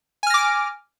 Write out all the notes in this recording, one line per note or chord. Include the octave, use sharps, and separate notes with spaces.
G#5 D6 F6 A#6 D7